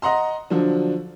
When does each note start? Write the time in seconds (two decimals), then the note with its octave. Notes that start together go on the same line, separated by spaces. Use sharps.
0.02 D#5 F#5 A#5 C6
0.50 D3 F3 F#3 D4